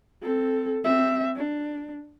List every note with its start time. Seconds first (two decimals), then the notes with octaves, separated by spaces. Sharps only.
0.23 C4 A4
0.83 C4 E5
1.36 D4